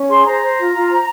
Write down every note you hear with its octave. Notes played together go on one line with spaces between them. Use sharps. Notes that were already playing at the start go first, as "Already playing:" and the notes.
Already playing: C#4
G#4 C6
C5 A#5
C5
F4
F4
C5